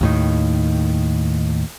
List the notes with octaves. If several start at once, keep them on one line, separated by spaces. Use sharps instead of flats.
D#2 A2 D#3